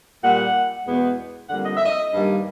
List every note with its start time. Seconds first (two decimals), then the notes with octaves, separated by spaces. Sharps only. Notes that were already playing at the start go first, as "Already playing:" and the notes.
0.22 A#2 G3 A#3 F#5
0.86 E2 B2 G#3 B3
1.50 F2 D3 G3 A#3 F#5
1.65 D#5
1.76 E5
1.85 D#5
2.13 G2 D#3 G3 A#3